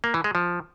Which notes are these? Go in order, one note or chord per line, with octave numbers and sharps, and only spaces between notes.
A#3
E3
G#3
F3